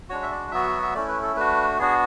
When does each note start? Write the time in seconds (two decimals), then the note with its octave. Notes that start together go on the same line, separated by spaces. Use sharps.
0.09 G#3 D4 F#4 C#5
0.23 E5
0.31 D5
0.52 F#3 B3 F#4 E5
0.82 E5
0.95 A3 C#4 E4 D5
1.08 B4
1.22 A4
1.36 A3 D4 F#4 B4
1.79 B3 D4 F#4 G#4